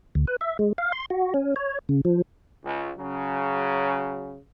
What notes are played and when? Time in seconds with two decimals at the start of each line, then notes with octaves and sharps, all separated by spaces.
0.15 D2
0.27 B4
0.41 E5
0.59 G#3
0.78 F5
0.92 C6
1.10 F#4
1.34 C#4
1.56 C#5
1.89 C#3
2.05 F3
2.65 C#2
2.99 C#3 F#3